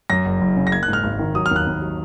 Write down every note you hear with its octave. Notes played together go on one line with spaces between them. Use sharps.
F#2 A#6
F#1
F#1
C#3
A#6
A#3 G#6
F#6
G#2
F6
G#1
D#3
F#3 D#6
F6
D#2 F#6
D#2
F#3